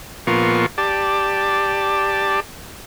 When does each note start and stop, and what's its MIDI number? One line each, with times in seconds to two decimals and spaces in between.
0.27 0.66 46
0.27 0.66 53
0.27 0.66 59
0.27 0.66 65
0.27 0.66 70
0.27 0.66 85
0.78 2.40 67
0.78 2.40 74
0.78 2.40 81